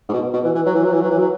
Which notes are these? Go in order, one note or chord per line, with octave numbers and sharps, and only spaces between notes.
G#2
B2
B2
E3
E3
F#3
E3
F#3
E3
F#3
E3
F#3